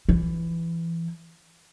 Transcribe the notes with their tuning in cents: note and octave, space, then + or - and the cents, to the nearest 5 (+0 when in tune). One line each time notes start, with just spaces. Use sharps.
E3 +20